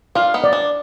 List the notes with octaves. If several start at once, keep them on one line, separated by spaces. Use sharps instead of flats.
D4 F4 F5
B3 D#4
D5
D4